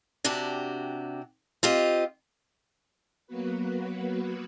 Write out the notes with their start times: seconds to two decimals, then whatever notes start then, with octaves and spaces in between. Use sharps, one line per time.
0.24 C3 D4 F#4 G4
1.63 C4 F4 G4 D#5
3.27 F#3 A#3 B3 F#4 B4